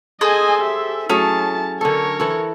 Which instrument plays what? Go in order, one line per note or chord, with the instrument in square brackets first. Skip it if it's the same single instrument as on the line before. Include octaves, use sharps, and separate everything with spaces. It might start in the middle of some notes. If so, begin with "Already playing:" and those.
[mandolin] G#4 A4 C5 [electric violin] D#5 G#5
[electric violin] G4 E5
[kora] F#3 A3 G#4 [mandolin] C#4 [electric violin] E4 A5
[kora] D3 A4 [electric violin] A#4 C#5
[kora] E3 A4